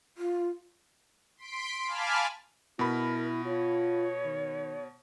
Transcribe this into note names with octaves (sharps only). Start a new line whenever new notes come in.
F4
C6 B6 D7
F5 G#5 A5 B5 D6 F6
B2 E4 A#4 B5
F4 C#5
D#3